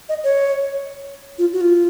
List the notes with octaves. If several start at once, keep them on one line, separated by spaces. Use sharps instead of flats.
D#5
C#5
F4
F#4
F4